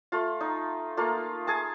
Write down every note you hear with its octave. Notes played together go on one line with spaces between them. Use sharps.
A3 F4
D#4
A3 A#3 F4
G#4 G#5 A5